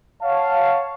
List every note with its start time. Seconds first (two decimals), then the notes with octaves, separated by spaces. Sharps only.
0.22 C#5 F5 F#5 A5